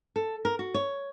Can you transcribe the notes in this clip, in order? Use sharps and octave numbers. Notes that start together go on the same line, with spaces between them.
A4
A#4
F#4
C#5